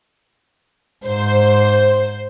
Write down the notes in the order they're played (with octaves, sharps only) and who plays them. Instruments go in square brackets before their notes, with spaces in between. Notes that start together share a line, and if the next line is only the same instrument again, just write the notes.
[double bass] G#2 [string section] C5